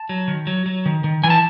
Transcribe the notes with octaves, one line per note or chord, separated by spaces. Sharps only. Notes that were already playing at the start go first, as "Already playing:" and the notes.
Already playing: A5
F#3
D#3
F#3
F#3
D#3
D#3
E3 G#5
A5